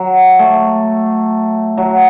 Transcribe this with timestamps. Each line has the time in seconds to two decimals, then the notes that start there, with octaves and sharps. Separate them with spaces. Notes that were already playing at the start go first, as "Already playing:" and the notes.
Already playing: F#3
0.39 A3
1.77 F#3